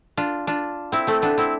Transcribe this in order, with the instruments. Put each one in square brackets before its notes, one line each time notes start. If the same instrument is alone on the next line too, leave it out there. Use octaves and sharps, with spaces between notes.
[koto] D4 F4
D4 F4
C4 E4
A3 C4
B3 D4
C4 E4